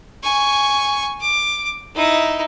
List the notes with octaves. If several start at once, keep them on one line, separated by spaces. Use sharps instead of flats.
G#5 C#6
D6
D#4 E4